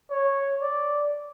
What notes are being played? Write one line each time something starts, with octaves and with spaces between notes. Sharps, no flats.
C#5
D5